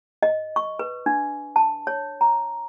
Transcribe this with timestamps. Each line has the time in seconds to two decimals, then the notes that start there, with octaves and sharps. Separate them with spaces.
0.23 D#5
0.56 C#6
0.79 B4
1.06 D4
1.56 A5
1.87 C#5
2.21 A#5